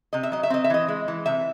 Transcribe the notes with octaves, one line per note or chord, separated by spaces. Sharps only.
C3 D#5
E5
F#3 D#5
E5
C4 D#5
E5
E3 D#5
G#3
E3
C3 E5